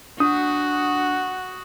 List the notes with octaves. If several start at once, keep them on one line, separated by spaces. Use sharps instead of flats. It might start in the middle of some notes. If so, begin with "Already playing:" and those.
D4 F#4 F#5 D#6